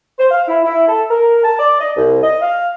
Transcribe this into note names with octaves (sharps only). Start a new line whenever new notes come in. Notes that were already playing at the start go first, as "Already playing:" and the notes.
C5
F5
E4
E4
A4
A#4
A5
D5
D#5
C2
D#5
F5